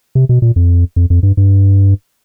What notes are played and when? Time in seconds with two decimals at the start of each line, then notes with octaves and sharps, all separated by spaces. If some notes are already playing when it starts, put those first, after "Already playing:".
0.15 C3
0.29 B2
0.42 A#2
0.56 F2
0.96 F2
1.10 F2
1.23 G2
1.37 G2